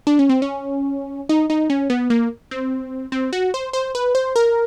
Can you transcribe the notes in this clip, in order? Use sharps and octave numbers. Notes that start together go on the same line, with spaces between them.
D4
C#4
C4
C#4
D#4
D#4
C#4
B3
A#3
C4
C4
F#4
C5
C5
B4
C5
A#4